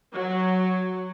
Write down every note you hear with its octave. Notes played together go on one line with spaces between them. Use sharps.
F#3